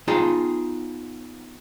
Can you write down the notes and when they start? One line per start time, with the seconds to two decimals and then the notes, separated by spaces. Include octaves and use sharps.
0.07 B3 D#4 F4 G#4 G5 A5